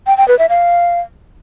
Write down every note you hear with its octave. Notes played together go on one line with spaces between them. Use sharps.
G5
G5
B4
E5
F5